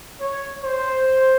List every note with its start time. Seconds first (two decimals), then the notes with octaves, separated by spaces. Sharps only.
0.20 C#5
0.64 C5